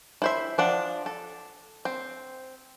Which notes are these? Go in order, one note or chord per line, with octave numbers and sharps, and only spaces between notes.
E4 C5 E5
F3 D4 F#5
A4
C4